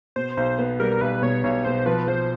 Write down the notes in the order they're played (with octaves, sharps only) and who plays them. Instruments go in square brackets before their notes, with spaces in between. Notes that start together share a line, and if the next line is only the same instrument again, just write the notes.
[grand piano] B2 [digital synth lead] C5
[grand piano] B1 [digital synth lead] C5
[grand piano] B3
[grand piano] G3 [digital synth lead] A#4
[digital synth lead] A#4
[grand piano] B1 [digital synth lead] B4
[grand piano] B2 [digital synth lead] C#5
[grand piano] B1 [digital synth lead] C#5
[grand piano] B2 [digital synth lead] C5
[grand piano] F3 [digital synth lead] B4
[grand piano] F3 [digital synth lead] C5